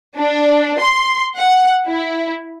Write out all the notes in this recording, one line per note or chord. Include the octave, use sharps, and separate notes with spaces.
D4
C6
F#5
E4